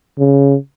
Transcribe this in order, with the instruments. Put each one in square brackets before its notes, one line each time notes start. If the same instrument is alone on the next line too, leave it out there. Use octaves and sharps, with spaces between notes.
[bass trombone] C#3